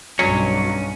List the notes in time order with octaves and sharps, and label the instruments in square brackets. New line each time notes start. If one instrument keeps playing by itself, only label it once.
[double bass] B1 G2 [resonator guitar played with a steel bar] F#3 [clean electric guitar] C#4